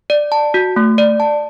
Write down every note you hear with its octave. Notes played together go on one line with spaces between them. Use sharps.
D5
A5
F#4
A3
D5
A5